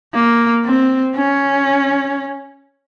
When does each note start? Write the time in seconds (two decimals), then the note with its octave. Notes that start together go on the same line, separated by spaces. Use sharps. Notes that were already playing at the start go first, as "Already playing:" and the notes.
0.15 A#3
0.65 C4
1.16 C#4